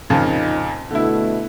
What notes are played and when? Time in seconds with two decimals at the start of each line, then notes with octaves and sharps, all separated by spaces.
0.10 F2 A#2 C#3 F3 D#4
0.91 B2 D3 A3 E4